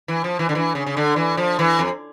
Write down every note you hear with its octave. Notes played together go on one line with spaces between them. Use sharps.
E3
F3
E3
D3
E3
C#3
C#3
D3
E3
F3
E3
F2